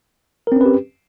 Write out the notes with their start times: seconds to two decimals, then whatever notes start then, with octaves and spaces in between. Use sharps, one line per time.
0.47 A#4
0.52 C4
0.56 C#4
0.61 B4
0.65 G4